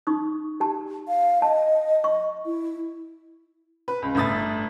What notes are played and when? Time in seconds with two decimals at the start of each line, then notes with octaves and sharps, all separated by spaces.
0.07 D#4 C#6 D#6
0.60 G4 A5
1.08 F5
1.42 D#5 A5
2.04 C#6
2.46 E4
3.88 B4
4.02 C#2
4.15 G1 A2 E5 D#6 A6